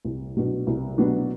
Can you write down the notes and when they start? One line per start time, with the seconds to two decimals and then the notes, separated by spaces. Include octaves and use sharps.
0.05 C2
0.37 B2 F#3 B3 D4
0.67 C2
0.98 B2 F#3 B3 D4